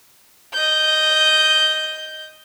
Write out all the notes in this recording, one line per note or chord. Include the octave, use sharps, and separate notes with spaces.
D#5 G6